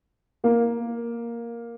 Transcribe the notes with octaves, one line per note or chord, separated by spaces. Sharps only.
A#3 A#4